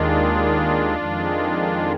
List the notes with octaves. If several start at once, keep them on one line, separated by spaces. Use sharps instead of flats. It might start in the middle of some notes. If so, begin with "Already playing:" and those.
Already playing: D#2 D#3 G#3 D4 F4
F2 D#3 G#3